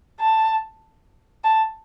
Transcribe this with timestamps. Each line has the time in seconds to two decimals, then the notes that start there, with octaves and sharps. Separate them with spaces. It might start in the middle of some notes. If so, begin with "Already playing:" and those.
0.20 A5
1.44 A5